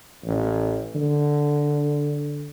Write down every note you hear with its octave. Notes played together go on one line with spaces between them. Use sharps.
A1
D3